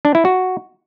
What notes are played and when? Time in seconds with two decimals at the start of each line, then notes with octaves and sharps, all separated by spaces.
0.05 D4
0.15 E4
0.25 F#4